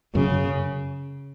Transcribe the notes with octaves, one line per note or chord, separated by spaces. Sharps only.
F#2 C#3